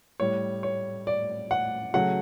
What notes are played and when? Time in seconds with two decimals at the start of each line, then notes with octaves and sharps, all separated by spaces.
0.20 A2 G3 C#5
0.63 C#5
1.07 D5
1.51 F#5
1.94 C#3 F#3 A3 F#5